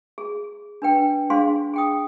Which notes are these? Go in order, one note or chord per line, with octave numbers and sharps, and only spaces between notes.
G#4
D4 B4 G5
D4 G#4 C5 F5 C6
G#4 G5 D#6